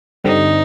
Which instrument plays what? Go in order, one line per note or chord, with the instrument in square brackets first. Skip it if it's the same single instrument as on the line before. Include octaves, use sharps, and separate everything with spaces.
[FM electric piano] G2 D3 G3 C4 [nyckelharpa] D#4